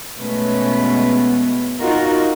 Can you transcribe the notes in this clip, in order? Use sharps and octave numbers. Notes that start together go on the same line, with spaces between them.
B2 G#3 A3 B3 C#4 B4
D#4 F4 F#4 A#4